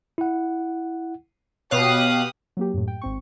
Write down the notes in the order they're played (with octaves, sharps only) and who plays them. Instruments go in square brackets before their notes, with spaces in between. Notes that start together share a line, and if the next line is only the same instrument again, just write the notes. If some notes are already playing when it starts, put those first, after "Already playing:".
[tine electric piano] E4 F#5
[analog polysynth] B2 F5 F#6 [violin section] G4 D#6 [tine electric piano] C#5
[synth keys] F#3 A#3 G4
F#2 A2
G5
G#1 C4 C#6